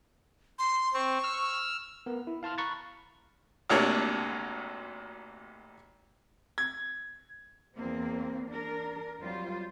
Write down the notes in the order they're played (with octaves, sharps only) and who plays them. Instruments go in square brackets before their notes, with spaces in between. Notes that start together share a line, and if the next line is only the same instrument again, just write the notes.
[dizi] C6
[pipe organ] C4 [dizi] C#6
[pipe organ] E6 F6
[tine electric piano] B3 A#4
E4
F5 A5 C6 F6
A#5 B5 C#6 F#6 A6
[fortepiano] G#1 D2 C3 A#3 D4 C#5
[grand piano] G#6
[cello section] E2 A#3 C4
D4 A#4
F2 F#3 G3 F4 C5